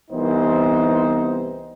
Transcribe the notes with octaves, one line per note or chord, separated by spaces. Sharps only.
C2 E3 B3 C4 D#4 C5